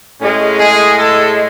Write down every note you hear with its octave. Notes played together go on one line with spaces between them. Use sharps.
A2 G#3 C#4
G#4
A4